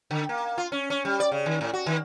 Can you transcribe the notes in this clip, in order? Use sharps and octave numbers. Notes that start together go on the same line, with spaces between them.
D3
A#3
F4
C#4
C#4
G3
D5
C#3
D#3
A2
F#4
D#3